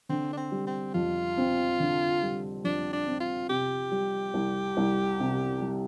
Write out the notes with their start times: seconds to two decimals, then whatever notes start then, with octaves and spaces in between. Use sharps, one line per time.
0.09 D3 C4
0.33 D4
0.37 C4
0.52 G3
0.67 C4
0.94 F2 F4
1.37 C4
1.80 D3
2.22 G3
2.64 F2 D4
2.93 D4
3.07 C4
3.20 F4
3.49 C3 G4
3.91 G3
4.34 C2
4.77 C2
5.20 C3
5.61 G3